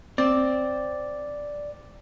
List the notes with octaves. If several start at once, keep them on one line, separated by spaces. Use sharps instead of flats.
C4 D5